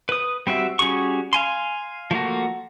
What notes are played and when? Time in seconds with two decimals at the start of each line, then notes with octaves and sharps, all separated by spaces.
0.09 B4 D#6
0.47 G3 C4 F#4 E5
0.79 G3 C#4 F#4 G#4 C#6
1.33 F5 G#5 C6
2.11 F3 A3 A#3 F#4